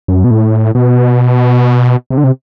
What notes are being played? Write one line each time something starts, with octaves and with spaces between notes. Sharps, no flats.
F#2
B2
A2
B2
C3
D3
C3